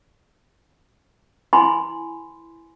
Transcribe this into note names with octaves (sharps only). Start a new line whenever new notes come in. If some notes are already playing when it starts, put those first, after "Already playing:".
E4 G#5 B5 C6